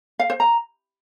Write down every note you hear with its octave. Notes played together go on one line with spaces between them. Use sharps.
F5
C5
A#5